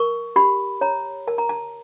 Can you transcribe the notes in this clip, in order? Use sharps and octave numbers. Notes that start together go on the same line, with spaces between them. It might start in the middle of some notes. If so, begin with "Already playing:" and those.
Already playing: A#4 C#6
G4 B5
C#5 A#5
A#4 A5
A#5
A5